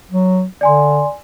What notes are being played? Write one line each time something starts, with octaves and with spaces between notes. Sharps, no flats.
F#3
D3 D5 G#5 C6